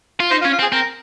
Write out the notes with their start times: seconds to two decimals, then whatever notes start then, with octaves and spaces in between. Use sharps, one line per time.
0.20 F4
0.31 D#4 C5
0.41 F4
0.45 C#4
0.52 F4
0.59 C4
0.62 G#4
0.72 C4 A#4